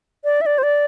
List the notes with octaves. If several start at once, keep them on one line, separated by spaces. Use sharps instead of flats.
D5
E5
D5
C5
D5